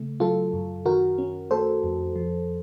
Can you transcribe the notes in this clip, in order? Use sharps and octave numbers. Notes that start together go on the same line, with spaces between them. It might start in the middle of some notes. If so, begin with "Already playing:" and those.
Already playing: C#3 A3
F#3 F4 A4
F#2
D#3 F#4 A#4
C#4
A3 A4 C5
F2
F3